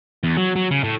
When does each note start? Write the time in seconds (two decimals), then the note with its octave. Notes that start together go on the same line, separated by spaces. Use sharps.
0.24 E2
0.37 F#3
0.56 F#3
0.71 C#3
0.84 A2